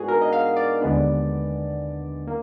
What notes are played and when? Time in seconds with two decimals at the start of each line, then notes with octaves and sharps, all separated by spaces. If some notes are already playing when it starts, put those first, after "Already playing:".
Already playing: G#2 B3 D4 F#4 G#4
0.08 A#4
0.22 D#5
0.33 F5
0.56 D5
0.81 D#2 D3 G#3 B3 D4
2.27 A#3